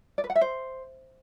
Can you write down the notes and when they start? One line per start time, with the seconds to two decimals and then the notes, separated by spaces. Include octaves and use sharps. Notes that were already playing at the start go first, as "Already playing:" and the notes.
0.18 D5
0.24 B4
0.30 F#5
0.36 E5
0.41 C5